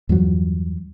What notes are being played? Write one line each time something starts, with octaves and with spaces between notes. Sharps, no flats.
E2 G2 F3 F#3